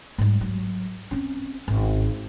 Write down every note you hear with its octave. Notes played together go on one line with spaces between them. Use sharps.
G#2 G3
F#3
C4 C#4
G#1